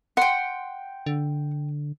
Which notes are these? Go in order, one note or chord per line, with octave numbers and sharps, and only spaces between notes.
F#5 G5 C6
D3